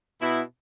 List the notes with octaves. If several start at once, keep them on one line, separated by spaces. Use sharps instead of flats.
B2 B3 E4